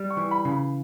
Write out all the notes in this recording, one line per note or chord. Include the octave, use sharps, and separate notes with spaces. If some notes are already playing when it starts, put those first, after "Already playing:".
Already playing: G3
C#6
E3
B5
C#3
B5